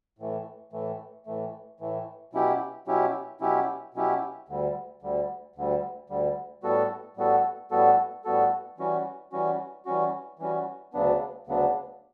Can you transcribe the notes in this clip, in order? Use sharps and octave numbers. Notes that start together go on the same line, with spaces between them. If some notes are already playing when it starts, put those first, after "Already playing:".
A2 E3 A3
A2 E3 A3
A2 E3 A3
A2 E3 A3
B2 F#3 C#4 E4 G4
B2 F#3 C#4 E4 G4
B2 F#3 C#4 E4 G4
B2 F#3 C#4 E4 G4
D2 D3 G3
D2 D3 G3
D2 D3 G3
D2 D3 G3
A2 G3 B3 F#4 A4
A2 G3 B3 F#4 A4
A2 G3 B3 F#4 A4
A2 G3 B3 F#4 A4
E3 G3 C#4 F#4
E3 G3 C#4 F#4
E3 G3 C#4 F#4
E3 G3 C#4 F#4
D2 C#3 F#3 B3 D4
D2 C#3 F#3 B3 D4